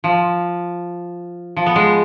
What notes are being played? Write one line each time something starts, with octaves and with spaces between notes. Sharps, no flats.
F3
F3
B3
G#3